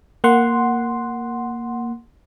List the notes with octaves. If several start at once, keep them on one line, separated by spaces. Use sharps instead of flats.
A#3 F#5 C6